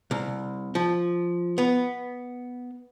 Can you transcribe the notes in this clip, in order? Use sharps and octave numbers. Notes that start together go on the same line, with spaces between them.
C2
F3
B3